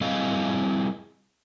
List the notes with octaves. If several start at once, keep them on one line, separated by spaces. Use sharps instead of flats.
G3 C4 E4 G#4 D#5 F5